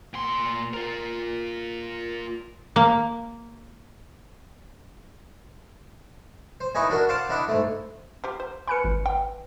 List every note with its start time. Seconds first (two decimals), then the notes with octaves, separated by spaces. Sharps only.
0.14 A#2 C6
0.73 F4 A#4
2.76 A#3
6.60 C5
6.75 D#4 E4 B4 C#5 D#5 G#5
6.90 D4 F#4 A#4 F#5
7.09 C5 F5 F#5 A5 C6 D6
7.29 D4 E4 D#5 F#5 B5 D6
7.48 G#2 A3
8.24 F3 G4
8.40 C5
8.68 B4 G#5 B5 F#6 C#7
8.84 G#1
9.06 G5